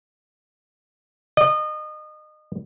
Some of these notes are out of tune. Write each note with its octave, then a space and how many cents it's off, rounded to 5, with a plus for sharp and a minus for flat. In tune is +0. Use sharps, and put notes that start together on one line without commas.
D#5 -30